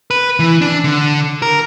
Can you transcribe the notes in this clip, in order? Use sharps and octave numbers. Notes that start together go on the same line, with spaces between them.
B4
E3
D4
D3
A#4